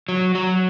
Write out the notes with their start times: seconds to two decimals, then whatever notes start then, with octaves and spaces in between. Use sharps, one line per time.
0.09 F#3
0.35 F#3